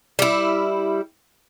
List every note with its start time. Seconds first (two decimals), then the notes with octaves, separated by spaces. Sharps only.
0.19 G3 E4